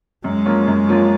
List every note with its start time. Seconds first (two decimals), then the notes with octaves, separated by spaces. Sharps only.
0.24 F#2 G#3
0.46 F3 A#3 C#4 F4
0.67 F#2
0.88 F3 A#3 C#4 F4